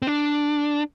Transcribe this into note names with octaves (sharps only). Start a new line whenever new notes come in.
C4
D4